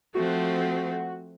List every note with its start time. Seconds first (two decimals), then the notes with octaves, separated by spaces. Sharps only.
0.15 F3 A3 C4 F#4